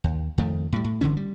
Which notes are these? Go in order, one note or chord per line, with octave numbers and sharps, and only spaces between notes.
D#2
F2 D#3 A3
A2 G3
A2
G1 D3 E3 C#4
G3